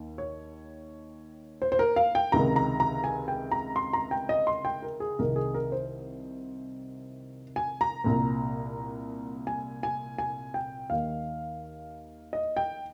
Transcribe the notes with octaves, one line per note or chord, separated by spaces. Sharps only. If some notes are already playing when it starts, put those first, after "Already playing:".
Already playing: D#2 D#3
C#5
C5
C5
A#4
F5
G5
C#2 C3 D#3 A#5
A#5
A#5
G#5
G5
A#5
C6
A#5
G5
D#5
C6
G5
A#4
G#4
C2 C3 D#3 A#4
G#4
A#4
C5
G#5
A#5
C2 A#2
G#5
G#5
G#5
G5
D#2 D#3 F5
D#5
G5